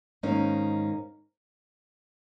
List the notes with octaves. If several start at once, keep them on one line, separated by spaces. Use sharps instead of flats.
G#2 D#3 A#3 C#4 D#4